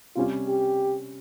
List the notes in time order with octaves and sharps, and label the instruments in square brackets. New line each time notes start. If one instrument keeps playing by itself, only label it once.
[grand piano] C3 G3 C#4 [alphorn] F4
[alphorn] G4